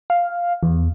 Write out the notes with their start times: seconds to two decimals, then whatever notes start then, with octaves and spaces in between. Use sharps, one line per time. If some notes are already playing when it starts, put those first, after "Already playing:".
0.10 F5
0.63 E2